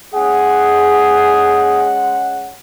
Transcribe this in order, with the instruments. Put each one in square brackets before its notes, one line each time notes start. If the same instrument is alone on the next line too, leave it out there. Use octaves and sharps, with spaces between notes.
[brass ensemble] G#3 C#4 F#5 [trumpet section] G#4